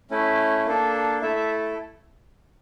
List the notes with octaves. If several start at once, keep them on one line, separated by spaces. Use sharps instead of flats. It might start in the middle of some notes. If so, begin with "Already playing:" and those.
A3 C#4 E4
A#3 D4 A4
A3 E4 A4 E5
E5